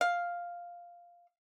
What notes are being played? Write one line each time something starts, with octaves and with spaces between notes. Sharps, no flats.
F5